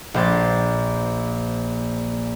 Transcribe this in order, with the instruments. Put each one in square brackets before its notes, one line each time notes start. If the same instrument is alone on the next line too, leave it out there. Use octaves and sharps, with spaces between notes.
[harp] A#1 C5 A6